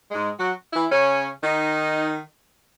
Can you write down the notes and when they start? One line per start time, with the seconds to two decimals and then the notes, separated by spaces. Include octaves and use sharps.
0.11 G#2 G#3
0.38 F#3 F#4
0.73 E3 E4
0.90 C#3 C#4
1.43 D#3 D#4